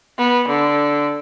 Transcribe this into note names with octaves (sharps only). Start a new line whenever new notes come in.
B3
D3